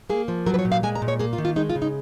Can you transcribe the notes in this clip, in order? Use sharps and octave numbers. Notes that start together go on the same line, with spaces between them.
A#3 G#4
F3
F#3 A#4
B4
C#5
A#2
F5
G#3 G#5
A#5
A#2
C#5
A#3 G#4
F4
D#3
F4
G#3 D#4
F4
C#3
D#4